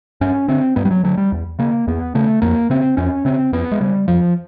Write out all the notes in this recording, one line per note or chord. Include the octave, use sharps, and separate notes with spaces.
G2 C#4
D3 C4
G2 B3
G3
F#3
D3 F#3
G3
E2
C#3 A#3
E2 B3
C#3 A3
F2 A#3
C#3 C4
F2 C#4
C#3 C4
F2 B3
G#3
C#3 G3
F2 F3